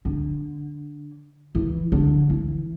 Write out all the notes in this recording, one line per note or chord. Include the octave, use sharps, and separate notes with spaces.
D3
E3
D3
E3